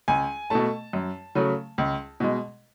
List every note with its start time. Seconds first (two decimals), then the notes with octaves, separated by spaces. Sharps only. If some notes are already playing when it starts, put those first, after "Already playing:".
0.08 C#2 G#5
0.50 B2 A3 A5
0.93 F#2
1.35 C#3 F#3 A3
1.78 C#2
2.20 B2 G#3